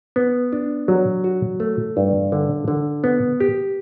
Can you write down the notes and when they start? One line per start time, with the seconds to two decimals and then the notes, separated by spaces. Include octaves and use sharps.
0.16 B3
0.53 D4
0.88 F#3
1.24 F#4
1.60 A3
1.97 G2
2.32 D3
2.68 D3
3.04 B3
3.40 G4